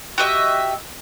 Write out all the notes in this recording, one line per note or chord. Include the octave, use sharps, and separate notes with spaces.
F#4 G4 D#5 E5